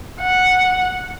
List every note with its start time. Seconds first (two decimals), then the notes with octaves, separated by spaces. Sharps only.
0.21 F#5